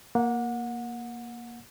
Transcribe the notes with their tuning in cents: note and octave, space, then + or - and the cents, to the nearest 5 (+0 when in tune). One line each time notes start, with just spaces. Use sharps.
A#3 +5 F#5 -25